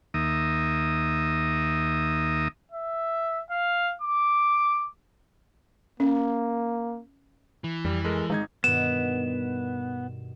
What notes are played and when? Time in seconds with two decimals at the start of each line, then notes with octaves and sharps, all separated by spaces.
0.14 D#2 D#3 A#3 E5 A#5 D#6
2.71 E5
3.51 F5
4.02 D6
6.00 A#3 C#4
7.64 E3
7.85 F2 G3
8.05 G#3 A4 A#4
8.30 G#1 G#3 D#4 G#6
8.64 G2 B2 D#3 B3 E7